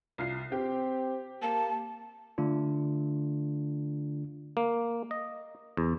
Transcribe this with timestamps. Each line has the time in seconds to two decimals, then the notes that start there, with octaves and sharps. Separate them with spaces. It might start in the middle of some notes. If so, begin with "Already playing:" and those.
0.18 C2 F4 C7
0.52 C4 G4
1.42 A#3 A5
2.38 D3 A3 D4 F4
4.57 A#3
5.11 D#5
5.77 E2